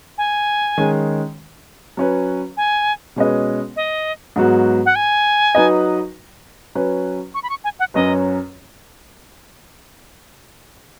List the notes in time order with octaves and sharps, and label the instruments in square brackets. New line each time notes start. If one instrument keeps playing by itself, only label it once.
[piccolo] G#5
[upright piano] D#3 G#3 C#4
F#3 C#4 B4
[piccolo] G#5
[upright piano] B2 G#3 C#4 B4 D#5
[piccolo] D#5
[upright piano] G#2 F#3 B3 F#4
[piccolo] F#5
G#5
[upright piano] F#3 D#4 F#4 B4 D#5
F#3 C#4 B4
[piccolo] C#6
B5
C#6
G#5
F#5
[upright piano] F#2 F#3 C#4 B4 [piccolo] D#5